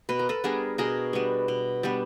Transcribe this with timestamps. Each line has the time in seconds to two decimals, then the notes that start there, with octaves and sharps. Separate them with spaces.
0.09 B2 B4
0.19 A#4
0.29 A4 B4
0.44 G3 B3 D4 G#4 A#4
0.78 B2 G#4 A#4
1.13 G3 B3 D4
1.48 B2
1.83 G3 B3 D4